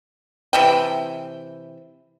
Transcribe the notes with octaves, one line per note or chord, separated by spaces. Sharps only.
C3 E3 G5